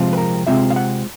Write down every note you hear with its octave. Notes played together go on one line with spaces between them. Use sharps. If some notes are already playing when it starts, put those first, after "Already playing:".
Already playing: C3 F3 G#3 C4 F4
B4
A#4
C3 F3 G#3 C4 F4 E5
F5
F#5